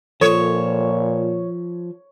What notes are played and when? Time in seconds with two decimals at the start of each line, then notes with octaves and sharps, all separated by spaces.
0.21 A#2 F3 A4 C#5